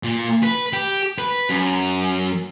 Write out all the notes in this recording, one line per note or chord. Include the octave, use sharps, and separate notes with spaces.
A#2
B4
G4
B4
F#2